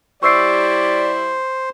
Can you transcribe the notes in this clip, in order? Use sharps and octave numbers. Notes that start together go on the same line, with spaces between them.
G3 E4 C5 D5 C#6 E6 C7